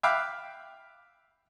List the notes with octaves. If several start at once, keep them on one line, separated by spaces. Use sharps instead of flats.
E5 F5 G5 B5 D6 F#6